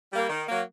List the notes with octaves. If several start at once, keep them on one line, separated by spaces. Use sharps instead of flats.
G3 A#3
D#3
F#3 A#3